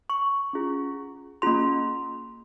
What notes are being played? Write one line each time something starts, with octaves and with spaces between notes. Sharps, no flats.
C#6
C#4 F4 G#4
A#3 C#4 F4 G#4 C6